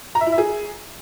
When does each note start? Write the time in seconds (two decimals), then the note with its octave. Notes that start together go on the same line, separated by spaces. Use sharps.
0.15 A#5
0.21 E5
0.26 E4
0.32 E5
0.38 G#4